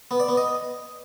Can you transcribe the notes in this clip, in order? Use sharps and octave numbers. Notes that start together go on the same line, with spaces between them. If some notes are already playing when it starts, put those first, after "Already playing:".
B3
D5
B3
D#5